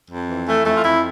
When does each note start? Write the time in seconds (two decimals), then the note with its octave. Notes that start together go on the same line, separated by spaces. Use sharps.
0.10 F2
0.28 E3
0.47 E3 A3
0.65 F2 A3
0.75 F4
0.83 F2 E4